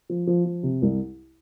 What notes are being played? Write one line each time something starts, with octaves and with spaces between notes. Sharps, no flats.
F3
F3
F3
C3
C2